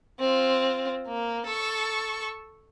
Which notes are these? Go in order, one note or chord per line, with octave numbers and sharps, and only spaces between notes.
C4 F4
A#3
A4 C#6